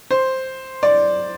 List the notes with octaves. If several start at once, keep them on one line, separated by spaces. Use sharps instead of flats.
C5
D5